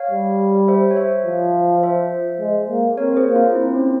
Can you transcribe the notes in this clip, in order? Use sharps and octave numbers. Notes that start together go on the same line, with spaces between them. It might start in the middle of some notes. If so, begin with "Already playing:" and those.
Already playing: C#5 F5
G3
C5 E5
C#5
C5 E5
F3
C5 E5
G#3
A#3
C4 A#4 C#5
G#4 C5
A#3
F4
C4 E4
C#4